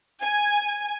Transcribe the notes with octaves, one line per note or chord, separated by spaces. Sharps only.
G#5